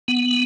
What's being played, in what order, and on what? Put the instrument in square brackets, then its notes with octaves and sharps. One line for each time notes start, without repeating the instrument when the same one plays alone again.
[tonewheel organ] B3